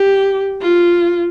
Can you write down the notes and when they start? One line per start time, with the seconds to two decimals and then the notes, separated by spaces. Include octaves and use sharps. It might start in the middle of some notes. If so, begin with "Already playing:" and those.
Already playing: G4
0.61 F4